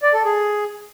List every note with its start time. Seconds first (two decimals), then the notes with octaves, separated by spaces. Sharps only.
0.02 D5
0.14 A4
0.25 G#4